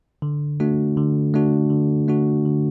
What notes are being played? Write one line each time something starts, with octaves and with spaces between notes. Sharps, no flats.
D3
A3 D4 F#4
D3
A3 D4 F#4
D3
A3 D4 F#4
D3